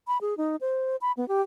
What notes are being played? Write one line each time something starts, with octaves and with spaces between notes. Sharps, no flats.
B5
G#4
D#4
C5
B5
B3
G4